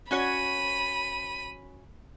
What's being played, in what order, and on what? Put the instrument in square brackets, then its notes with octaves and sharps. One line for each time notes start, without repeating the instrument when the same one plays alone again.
[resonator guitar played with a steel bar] C#4 F#4 C#5 [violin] B5 D#7